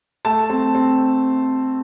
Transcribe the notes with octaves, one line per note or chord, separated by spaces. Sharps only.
A3 A5
C4
C4